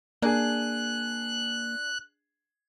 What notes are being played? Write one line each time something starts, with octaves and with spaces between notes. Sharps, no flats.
A#3 D4 G#4 F#6